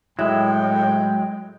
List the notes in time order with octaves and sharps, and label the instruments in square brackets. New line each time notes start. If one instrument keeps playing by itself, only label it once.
[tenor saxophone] A2 [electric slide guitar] F#3 G#3 [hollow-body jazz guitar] E4 [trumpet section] G5